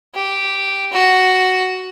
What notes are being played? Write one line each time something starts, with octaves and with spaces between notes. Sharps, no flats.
G4
F#4